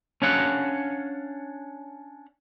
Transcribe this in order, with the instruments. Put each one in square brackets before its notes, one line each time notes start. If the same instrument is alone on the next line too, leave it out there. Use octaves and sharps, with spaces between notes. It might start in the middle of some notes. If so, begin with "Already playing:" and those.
[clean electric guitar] C#4 D4 C#5 F5 F#5